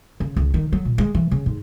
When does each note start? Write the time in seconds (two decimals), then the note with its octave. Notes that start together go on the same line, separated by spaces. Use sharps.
0.20 C#3
0.36 C#2
0.54 D#3
0.72 F#3
0.85 A#2
0.98 G#3
1.15 E3
1.31 C#3
1.46 G#2